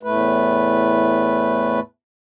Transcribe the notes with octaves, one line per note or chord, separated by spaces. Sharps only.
E2 A2 A3 B4